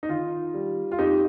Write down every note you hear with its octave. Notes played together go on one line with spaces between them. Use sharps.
D#4
D#3 F4
G3
F4
F2 D#4 G4